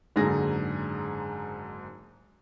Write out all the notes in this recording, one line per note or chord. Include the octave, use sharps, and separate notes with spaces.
F#1 G#2 D3 G#4 A#6